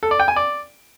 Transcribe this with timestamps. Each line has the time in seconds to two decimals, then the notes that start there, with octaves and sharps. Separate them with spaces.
0.03 A4
0.11 D5
0.20 G5
0.28 G#5
0.36 D5